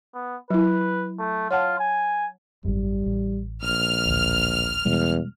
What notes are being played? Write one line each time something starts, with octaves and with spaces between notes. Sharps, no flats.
B3
F#3 E4 B4
A3
F4 C#5 F#5 A5
G#5
G#1 F#2 G3
A1
A#1 F6
A1 D2
E2 B2 G3 G#3